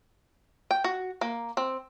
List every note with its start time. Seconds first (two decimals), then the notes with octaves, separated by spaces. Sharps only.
0.71 G5
0.84 F#4
1.21 A#3
1.57 C4